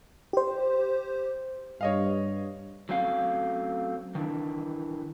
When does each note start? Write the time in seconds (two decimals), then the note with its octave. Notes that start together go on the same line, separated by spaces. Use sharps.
0.33 G4 C5
1.81 G2 C#5 D#5 F5
2.89 F#3 A3 C4 C#4 F5
4.15 D#3 E3 D4